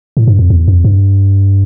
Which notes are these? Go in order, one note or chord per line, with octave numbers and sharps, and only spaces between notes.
A2
G2
F2
E2
F2
G2